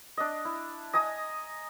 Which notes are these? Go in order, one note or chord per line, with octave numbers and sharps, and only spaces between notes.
D4 D#5
E4
D#5 G#5 A#5 D#6